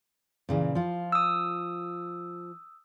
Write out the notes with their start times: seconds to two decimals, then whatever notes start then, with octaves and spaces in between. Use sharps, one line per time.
0.49 A#2 C#3 E3
0.75 F3 F4
1.12 D#6 E6